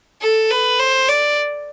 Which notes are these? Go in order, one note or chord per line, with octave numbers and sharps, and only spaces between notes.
A4
B4
C5
D5